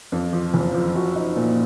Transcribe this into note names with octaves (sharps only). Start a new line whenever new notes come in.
F2
F3
F#1
F3
F#4
D#4
A#2